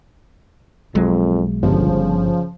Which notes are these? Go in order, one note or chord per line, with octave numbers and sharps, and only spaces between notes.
B1 F2 F#3 G#3
G1 C#3 F3